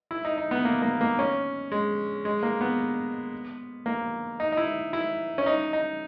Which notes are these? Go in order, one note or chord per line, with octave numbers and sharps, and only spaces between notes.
E4
D#4
D#4
B3
A#3
A#3
A#3
C#4
G#3
G#3
A#3
B3
A#3
D#4
D#4
E4
E4
C#4
D#4
D#4